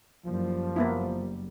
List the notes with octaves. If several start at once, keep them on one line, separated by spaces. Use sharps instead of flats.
F#1 F3 G3
A#3 B3 E4